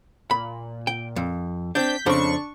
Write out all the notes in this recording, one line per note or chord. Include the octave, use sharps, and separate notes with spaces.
A#2 B5
G5
F2
C4 D4 G6 B6
F2 C#3 D4 C5 C#6